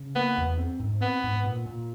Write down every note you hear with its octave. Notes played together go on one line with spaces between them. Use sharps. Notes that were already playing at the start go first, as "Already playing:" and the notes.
Already playing: C#3
A#3 B3
E2
C4
G#2
B3 C4
G#2
A#2
A#2